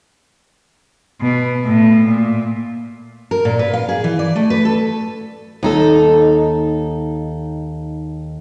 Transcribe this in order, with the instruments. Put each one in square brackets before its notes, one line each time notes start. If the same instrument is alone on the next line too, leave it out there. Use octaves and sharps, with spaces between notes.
[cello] B2
A2
A#2
[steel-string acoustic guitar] A#4
A#2
B4
F5
G#4
E3
D5
A3
B4
A4
D#2 D#4 A4